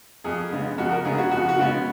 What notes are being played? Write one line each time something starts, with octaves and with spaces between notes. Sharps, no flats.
F2 G#4
C#3 G#3 B3
F2 F#4
A#4
C#3 G#3 B3 G#4
F#4
F2 F#4
F#4
C#3 G#3 B3